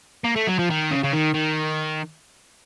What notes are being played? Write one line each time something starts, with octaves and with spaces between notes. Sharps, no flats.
A#3
A3
F#3
F3
D#3
C#3
C#3
D#3
D#3